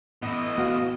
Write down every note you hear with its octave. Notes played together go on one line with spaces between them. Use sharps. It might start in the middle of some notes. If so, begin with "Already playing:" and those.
A2 E3 B3 D#5
B3 F#4 F5